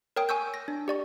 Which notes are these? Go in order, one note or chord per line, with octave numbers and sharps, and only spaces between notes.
A#4 C#5 G5 D#6
G#5 C#6 E6 G6
A#6
D4
G4 D5 C#6